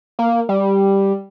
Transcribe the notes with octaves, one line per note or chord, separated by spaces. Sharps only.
A#3
G3